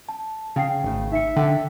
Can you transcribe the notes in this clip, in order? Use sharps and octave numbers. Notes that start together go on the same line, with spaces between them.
A5
C#3 F5 G5 C7
G#1 C#3 A3
D#4 E5 C#7
D3 G5